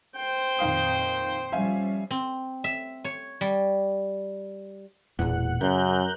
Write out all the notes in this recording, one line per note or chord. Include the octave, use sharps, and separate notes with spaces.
C5 G5
F2 A#2 D#3 F5 D#6
F3 G3 C#4 E5 F5 G#5
C4
E5
C#5
G3
E1 E2 A#2 F#5
F#2 C#3 A#4 F#6 G6